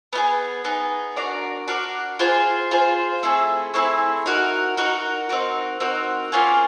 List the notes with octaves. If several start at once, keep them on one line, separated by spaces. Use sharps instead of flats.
B3 D#4 G#4
B3 D#4 G#4
D4 F#4 A#4 D5
D4 F#4 A#4 D5
F4 G#4 C5
F4 G#4 C5
A3 C4 E4 G#4
A3 C4 E4 G#4
D#4 F#4 A#4
D#4 F#4 A#4
C4 D#4 F#4 A#4
C4 D#4 F#4 A#4
A#3 C#4 F4 G#4